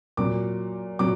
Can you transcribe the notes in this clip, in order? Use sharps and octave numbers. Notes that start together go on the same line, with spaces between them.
A#2 F#3 D6
A#2 F#3 D6